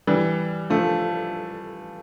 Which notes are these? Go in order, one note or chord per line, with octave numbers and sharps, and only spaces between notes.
E3 G3
F3 A3